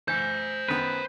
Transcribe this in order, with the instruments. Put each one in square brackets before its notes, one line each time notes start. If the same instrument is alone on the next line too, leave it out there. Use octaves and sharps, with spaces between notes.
[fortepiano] E3 [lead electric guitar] C5 G#5 [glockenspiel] G6
[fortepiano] F#2 D#3 B3 [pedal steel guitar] B4